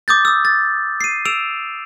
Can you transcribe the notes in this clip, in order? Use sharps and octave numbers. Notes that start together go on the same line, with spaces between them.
D6 D#6 G6 A6
D#6 E6
A6
C7 D#7
E6 D7 E7 F7